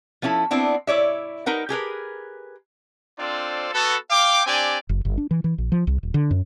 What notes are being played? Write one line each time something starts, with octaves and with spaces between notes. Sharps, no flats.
F3 B3 C#4 E4 A4
B3 C4 D4 E4
E4 C#5 D5 E5
D#4 A#4 B4 F#5
G4 G#4 A#4 B4
C4 D4 F4 A4 C5 D5
B3 F#4 A4
F5 G5 D6
C4 D4 G4 D5 G#5
F#1
G1
D4
E3
E3
A#1
F3
C2
D#1
D3
F#2